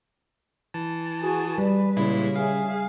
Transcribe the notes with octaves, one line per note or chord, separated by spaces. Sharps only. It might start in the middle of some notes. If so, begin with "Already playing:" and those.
E3 A5
F#4 G#4
G3 B4 D5
A#2 C#3 G#3 E4
G#4 E5 F5